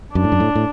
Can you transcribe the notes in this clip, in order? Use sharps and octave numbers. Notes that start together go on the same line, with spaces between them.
F#2 D4
A2
F#2
A2
A2